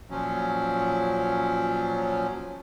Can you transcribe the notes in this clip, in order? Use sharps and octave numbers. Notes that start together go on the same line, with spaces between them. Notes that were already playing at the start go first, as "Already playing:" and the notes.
A#2 F3 F#3 C#4